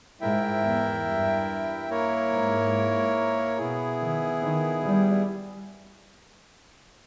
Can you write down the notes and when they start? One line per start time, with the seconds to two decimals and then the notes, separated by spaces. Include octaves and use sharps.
0.21 G#2 E4 A#4 E5 G5
0.63 E2
1.05 G2
1.89 A#3 E4 A#4 C#5
2.31 G#2
3.58 B2 B3 E4 G#4
4.00 D#3
4.42 D#3
4.83 G3